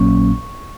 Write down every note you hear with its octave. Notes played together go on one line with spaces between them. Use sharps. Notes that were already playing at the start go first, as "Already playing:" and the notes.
Already playing: A#1 A#2 F#3 A#3 C#4 C#6